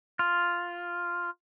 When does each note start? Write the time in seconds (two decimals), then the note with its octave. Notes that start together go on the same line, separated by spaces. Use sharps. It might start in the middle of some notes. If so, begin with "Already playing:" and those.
0.19 F4